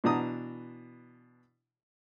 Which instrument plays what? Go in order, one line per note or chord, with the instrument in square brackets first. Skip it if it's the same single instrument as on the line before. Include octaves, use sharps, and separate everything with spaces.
[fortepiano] B2 E3 D4 A5 A#5 D#6